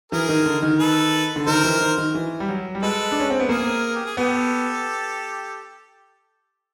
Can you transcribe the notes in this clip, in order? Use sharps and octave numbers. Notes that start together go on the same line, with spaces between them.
E3 G#4 A#4
D#3
D3
D#3
A4 B4
D3
D#3 A#4 C5
E3
D#3
D#3
E3
G3
F#3
G3
G#3 A4 B4
D4
C#4
C4
B3
A#3 G#4 A#4
G4
G#4
B3 G4 A4